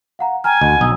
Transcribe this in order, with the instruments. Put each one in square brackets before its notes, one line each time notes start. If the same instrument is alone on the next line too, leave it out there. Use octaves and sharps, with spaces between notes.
[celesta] F5 F#5 A#5
[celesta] G5 A#5 F6 [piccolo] G#5
[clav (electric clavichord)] D2 [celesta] D#5 F#5 C6
[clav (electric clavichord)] B1 D#4 [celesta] D#6 E6